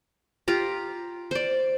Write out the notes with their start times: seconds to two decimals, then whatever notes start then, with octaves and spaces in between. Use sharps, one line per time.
0.48 F4 G4 A#5
1.31 C5 D5